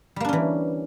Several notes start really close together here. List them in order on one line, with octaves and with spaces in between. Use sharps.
G3 A#3 D4 C#4 E3